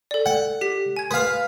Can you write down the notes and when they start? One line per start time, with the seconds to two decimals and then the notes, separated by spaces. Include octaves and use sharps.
0.11 A4 D5
0.26 F#5
0.61 G4 B6
0.97 G#5 G#6
1.11 B4 F5 D#6